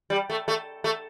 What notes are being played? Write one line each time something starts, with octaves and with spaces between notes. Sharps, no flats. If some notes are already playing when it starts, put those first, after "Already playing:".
G3
A3
A3
A3